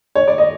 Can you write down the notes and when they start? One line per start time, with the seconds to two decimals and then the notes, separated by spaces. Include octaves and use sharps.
0.15 C#5
0.28 D5
0.38 D#5